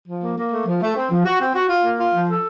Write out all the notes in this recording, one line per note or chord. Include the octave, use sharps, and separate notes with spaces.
F3
A#3
A#3
A3
F3
A3
C4
F3
F#4
C4
F#4
F4
A#3
F4
F3
A4